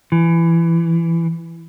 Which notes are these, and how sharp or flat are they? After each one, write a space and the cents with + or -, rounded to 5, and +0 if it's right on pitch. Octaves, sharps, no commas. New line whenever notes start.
E3 +20